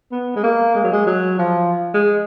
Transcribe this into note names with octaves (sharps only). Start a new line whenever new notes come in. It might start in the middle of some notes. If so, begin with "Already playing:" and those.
B3
G#3
A#3
G#3
F#3
G#3
F#3
F3
G#3